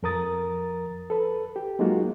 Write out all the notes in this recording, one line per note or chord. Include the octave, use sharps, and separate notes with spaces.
F2 F3 A#4 A#5 D#6 A6
A4 B4
G4
F#3 G#3 A#3 D#4 F4 F#4